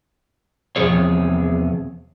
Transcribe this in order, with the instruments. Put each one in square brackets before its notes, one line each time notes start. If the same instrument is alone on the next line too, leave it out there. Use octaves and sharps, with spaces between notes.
[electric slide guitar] E2 C3 E3 F3 G#4 C#5